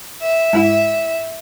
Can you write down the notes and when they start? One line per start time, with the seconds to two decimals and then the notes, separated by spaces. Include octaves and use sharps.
0.22 E5
0.53 G#2 E4